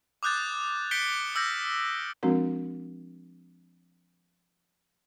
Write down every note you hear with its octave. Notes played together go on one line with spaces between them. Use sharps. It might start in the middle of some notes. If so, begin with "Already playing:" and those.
D6 D#6 F#6 G6 A6
G6 B6 C#7 D7 G7
D6 E6 F6 G6 A#6
F3 G#3 C4 D4 F#4 A#4